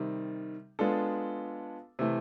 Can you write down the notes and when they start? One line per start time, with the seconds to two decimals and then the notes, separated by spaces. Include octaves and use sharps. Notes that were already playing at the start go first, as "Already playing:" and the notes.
Already playing: C3 D#3 G3
0.79 G#3 B3 D4 F4 A4
1.99 C3 E3 A3